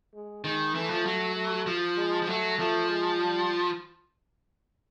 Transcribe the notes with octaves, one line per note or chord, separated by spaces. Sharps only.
G#3
D#3 G#3
E3 A3
F3
F#3
A3
F3
G#3
F3
F#3 A3
F3 A3
G#3
G3